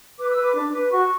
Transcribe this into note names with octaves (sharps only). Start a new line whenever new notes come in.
B4 D6
E6
B4
D6
D4
B4
F#4 C#6